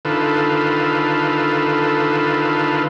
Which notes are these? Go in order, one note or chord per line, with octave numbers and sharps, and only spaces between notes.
D3 D#3 F4 A4 B4